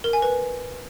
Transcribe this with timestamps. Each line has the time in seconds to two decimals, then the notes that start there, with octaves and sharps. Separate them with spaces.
0.04 A#4
0.13 G#5
0.22 B4